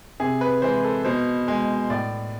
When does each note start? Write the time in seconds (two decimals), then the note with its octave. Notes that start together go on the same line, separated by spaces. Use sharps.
0.20 C3 G#4
0.41 B4
0.62 E3 G#3 C5
0.84 A4
1.05 B2 C5
1.48 G#3
1.90 A2 D5